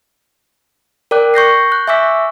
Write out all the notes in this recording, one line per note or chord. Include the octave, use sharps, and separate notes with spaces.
A#4 D5 G5 D6 F#6
C#6 G6 A#6 C7
F#6 G6
E5 G#5 C#6 D6 E6 B6